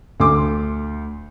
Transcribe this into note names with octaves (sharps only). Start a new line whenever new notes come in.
D2 C6 D6